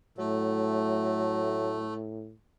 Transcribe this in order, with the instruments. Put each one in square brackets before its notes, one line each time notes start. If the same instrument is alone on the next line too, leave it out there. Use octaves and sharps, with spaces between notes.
[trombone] A2 [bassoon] F#3 [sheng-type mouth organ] A3